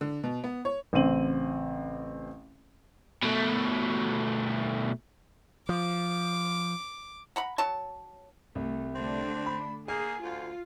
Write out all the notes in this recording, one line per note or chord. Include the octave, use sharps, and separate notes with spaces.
D3
B2
B3
C#5
A1 C#3 C4 D#7 F#7
B2 A3
F3 D6
F#5 A#5 B5
F#3 C#5 A5
C2 A3
D3 A3 C4 D4
B5
A#3 G#4 G#5
D2 F4